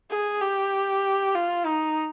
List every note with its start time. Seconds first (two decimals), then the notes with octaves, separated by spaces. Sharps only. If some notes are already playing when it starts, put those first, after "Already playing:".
0.10 G#4
0.41 G4
1.35 F4
1.66 D#4